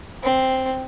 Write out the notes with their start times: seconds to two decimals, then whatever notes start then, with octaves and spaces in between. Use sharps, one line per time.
0.24 C4